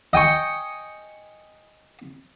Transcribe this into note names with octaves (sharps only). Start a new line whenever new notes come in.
D#5 G5 G#5 C#6